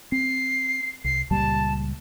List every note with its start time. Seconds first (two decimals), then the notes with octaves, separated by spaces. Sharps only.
0.12 C4 C7
1.04 C2 C7
1.31 C#2 A#2 G3 A5